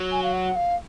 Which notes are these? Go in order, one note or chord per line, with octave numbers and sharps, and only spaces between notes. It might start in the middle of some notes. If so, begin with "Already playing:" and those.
Already playing: F#3
G#5
F5
F#5
F5